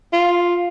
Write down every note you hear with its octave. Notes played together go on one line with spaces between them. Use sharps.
F4